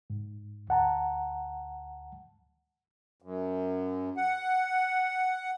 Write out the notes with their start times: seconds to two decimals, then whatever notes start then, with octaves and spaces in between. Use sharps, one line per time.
0.10 G#2
0.69 D2 F#5 A5 A#5
3.22 F#2
4.17 F#5